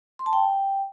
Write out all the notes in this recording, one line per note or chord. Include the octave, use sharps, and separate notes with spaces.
C6
A5
G5